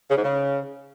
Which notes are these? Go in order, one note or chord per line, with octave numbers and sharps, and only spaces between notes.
C#3
G#2
C#3